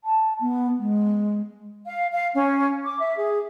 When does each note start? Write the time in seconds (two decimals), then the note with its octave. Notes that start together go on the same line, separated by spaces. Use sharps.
0.04 A5
0.41 B3
0.79 G#3
1.87 F5
2.12 F5
2.34 C#4
2.85 D6
2.98 E5
3.17 G#4